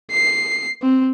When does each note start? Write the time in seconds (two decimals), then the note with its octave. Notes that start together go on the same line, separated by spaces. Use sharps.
0.11 C7
0.82 C4